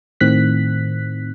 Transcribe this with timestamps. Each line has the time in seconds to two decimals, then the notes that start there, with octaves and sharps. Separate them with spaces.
0.21 A2 D#3 C4 F#6 B6